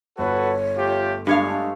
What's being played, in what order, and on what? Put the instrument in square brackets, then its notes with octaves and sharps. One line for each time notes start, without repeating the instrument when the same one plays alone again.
[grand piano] G1 [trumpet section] F#4 A4 B4 [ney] C#5
[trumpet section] A3 F4 G4
[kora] G2 C#5 F5 [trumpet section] G#3 A3 [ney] D4